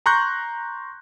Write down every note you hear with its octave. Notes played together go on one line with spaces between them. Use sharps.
A#5 C6 C#6 F#6 G6 A#6